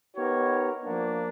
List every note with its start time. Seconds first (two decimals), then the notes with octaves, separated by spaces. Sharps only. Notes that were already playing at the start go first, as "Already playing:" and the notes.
0.16 B3 D#4 G4 A#4 C#5
0.84 F3 A#3 D4